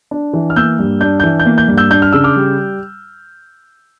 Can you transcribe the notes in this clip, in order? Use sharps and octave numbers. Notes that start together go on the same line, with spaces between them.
D4
E3
F6
A#3 E6 G6
G2
D4 G6
E3 G6
G6
A#3
G6
G2
E6 G6
D4 G6
F6
C#3 E6
D6 F6
G3